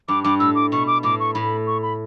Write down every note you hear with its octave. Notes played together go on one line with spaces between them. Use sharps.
G2 D6
G2 D6
A2 E6
D6
B2 C#6
D6
A2 D6
C#6
A2 B5
C#6
B5